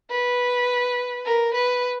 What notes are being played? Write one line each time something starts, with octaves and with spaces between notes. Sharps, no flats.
B4
A#4
B4